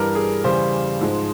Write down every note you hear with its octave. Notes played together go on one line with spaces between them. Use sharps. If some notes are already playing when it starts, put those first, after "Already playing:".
Already playing: G2 E3 G3 A#4
G#4
E2 C#3 G3 C5
G#2 F3 G#3